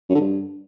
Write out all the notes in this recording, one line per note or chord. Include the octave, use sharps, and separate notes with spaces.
F#2
D3
G2